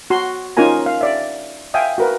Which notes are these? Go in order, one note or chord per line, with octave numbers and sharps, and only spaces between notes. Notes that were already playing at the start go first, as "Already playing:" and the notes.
F#4 C6
C#4 D#4 F4 A#4 G#5 A#5
F5
D5 E5
E5 F5 G5 G#5 D#6
F#4 A#4 B4